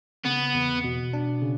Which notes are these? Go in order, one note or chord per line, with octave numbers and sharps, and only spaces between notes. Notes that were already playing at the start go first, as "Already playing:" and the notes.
C#3 B3
E2
B2
D4
C#3